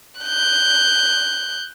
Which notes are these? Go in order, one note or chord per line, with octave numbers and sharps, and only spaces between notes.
F#6 G6